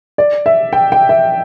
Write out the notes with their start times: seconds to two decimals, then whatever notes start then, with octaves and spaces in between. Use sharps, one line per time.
0.18 D5
0.46 E5
0.73 G5
0.92 G5
1.09 E5